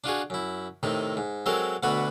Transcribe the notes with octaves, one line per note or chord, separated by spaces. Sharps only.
D4 F4 F#4 G#4
F#2 E4
A2 C3 D#3 D#4
G#2
F#3 G#3 C4 A4 A#4
D2 B2 D3 B3 F#4 B5